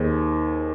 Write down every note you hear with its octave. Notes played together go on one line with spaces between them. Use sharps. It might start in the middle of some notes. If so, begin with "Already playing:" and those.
Already playing: D#2 D#3 G#4 C5